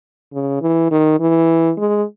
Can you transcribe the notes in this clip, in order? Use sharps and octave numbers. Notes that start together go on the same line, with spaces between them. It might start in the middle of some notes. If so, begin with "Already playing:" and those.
C#3
E3
D#3
E3
G#3